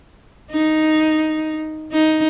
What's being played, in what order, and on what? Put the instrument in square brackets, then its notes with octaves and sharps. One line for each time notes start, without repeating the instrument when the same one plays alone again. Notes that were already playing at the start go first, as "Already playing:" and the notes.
[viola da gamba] D#4
D#4